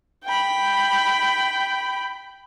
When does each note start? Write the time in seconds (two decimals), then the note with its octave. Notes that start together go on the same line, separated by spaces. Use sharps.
0.25 G5 B5